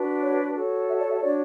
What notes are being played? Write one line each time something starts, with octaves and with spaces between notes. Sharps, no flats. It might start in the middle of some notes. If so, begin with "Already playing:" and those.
Already playing: D4 F#4 B4
C#5
F#4 A4 C#5
E5
D5
E5
D4 F#4 C#5 D5